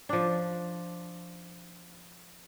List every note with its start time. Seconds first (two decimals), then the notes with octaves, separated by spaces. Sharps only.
0.09 F3 D4